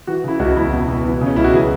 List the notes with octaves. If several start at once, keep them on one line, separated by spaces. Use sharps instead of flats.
E3 F#4
C#3 E4
C#2 F#4
E2 E4
B2
B2
E3
C#3 C#4
C#2 E4
F#4
E3 G#4